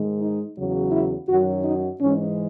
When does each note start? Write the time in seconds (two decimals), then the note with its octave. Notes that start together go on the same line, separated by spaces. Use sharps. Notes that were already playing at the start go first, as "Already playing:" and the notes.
Already playing: G#2 D#3 G#3
0.20 D#4
0.56 E2 C#3 F#3
0.92 E4
1.29 F#2 D#3 F#3 F#4
1.65 D#4
2.01 G#2 E3 G#3 C#4